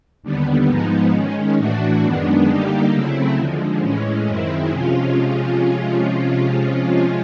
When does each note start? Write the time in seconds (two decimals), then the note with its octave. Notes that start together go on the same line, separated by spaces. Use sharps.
0.23 D#2 D3 G3 B3
0.67 G#2 F3 G#3 B3 D#4
1.13 D#3 G#3 C#4
1.57 A2 E3 A3 D4 F#4
2.02 F#2 D#3 G#3 B3 D4
2.48 D3 G3 A#3 D#4 G4
2.92 C#3 F#3 A3 C4 E4
3.37 D#2 D3 F3 G#3
3.81 A2 E3 G#3 C#4
4.26 F#2 D#3 G#3 C4 E4
4.71 C3 F3 G#3 C#4 F4